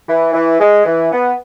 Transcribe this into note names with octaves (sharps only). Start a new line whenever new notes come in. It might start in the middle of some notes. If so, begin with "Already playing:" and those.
E3
E3
G#3
E3
B3